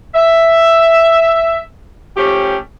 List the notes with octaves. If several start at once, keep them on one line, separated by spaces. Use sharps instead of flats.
E5
F3 A3 C#4 G4